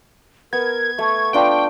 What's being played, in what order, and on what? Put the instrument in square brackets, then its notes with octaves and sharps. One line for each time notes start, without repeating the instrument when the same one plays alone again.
[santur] B3 [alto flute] A#4 [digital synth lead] G#6
[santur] A3 [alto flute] C#6
[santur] B3 D4 F4 [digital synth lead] G5